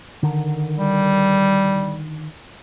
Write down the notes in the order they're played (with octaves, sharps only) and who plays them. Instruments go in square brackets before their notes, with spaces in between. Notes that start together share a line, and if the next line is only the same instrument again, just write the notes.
[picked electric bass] D3 D#3
[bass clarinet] G3